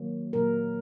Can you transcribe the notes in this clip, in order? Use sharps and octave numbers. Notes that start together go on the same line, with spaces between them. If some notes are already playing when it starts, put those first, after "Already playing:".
Already playing: D#3 F#3 A#3
A#2 F#3 A#3 A#4